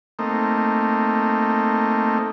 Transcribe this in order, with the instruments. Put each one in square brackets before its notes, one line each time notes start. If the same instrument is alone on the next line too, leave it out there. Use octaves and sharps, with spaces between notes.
[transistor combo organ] A3 A#3 C4 D#4